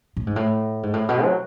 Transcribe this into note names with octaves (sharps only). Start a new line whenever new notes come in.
A2
G#2
A2
G#2
A2
B2
F#3